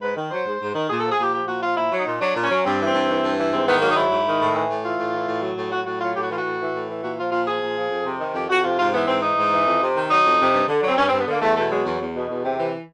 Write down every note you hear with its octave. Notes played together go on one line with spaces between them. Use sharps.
G#2 B4
D#3
F#3 C5
G#2
G#2
D#3
A#2 G#4
A4
F3
G#4
A#2 G4
F3 G4
A#2 F#4
F3 F4
A#2 E4
F#3
D#4
A#2
F#3 D4
A#2
C#4
F#3
G2 C4
E3
C4
G2
E3
G2
E3
G#2 C4
D#3 B3
F#3 A#3
D#4
G#2 E4
G#2
D#3
A2
E3
A2
E3 F4
A2
E3
A2
F#3
A2
F#3 F#4
A2 F#4
F#3 F4
A2 G4
F#4
E3 F4
F#4
A2
E3
A2
E3
A#2 F#4
F3 F4
A#2 F4
F3 G#4
A#2
F3
F2
C3
D#3
F2 G4
F2 F#4
C3 F4
G#2 F4
E3 B3
G#2 C4
E3 D#4
G#2
E3
F2
C3
D#3
F#3 D#4
F2
C3
G2
D3
F#3 C4
G2 C#4
C4
G2
B3
D3 A#3
E2 A3
B2 A3
F#3 G#3
E2
E2
B2
E2
C3
E3